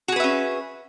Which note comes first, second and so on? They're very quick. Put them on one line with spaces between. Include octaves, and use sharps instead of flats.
F#4 G#4 B4 E5 C#4